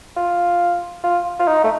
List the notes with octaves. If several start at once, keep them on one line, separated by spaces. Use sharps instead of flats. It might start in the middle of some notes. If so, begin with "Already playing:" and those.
F4
F4
F4
D#4
A3